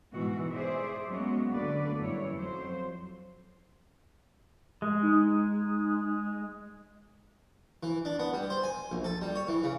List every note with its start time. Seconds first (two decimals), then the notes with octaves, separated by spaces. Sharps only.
0.13 G#2 B2 E3 F#4
0.51 G#4 C5 D5 E5
1.07 F#3 G#3 A#3 B3 C#4 F#4
1.51 D2 D3 A#3 B3 B4 D5
1.99 F#2 E3 G3 E4 C#5
2.35 F2 F#3 C5
4.82 G#3
5.02 D#4
7.83 E3
8.05 D4
8.19 B3
8.33 G3
8.50 C5
8.63 G#5
8.92 A#1
9.04 A4
9.21 G3
9.35 C#5
9.48 E3
9.64 C#3